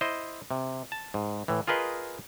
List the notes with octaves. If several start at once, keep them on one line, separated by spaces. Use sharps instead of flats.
E4 C5 D#5
C3
A5
G#2
A2 E3
F4 G#4 A#4 B4 D#5